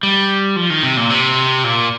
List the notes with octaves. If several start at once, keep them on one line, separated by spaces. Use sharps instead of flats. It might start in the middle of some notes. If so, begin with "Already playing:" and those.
G3
F3
D#3
C3
A#2
C3
A#2